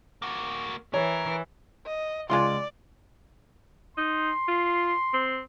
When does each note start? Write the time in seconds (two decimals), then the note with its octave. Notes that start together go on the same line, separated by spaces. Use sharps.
0.22 A#3 F#4
0.94 E3 A#4 C#5
1.86 D#5
2.30 C#2 G#3 F4 D5 C6
3.97 D#4 C6
4.48 F4
5.13 C4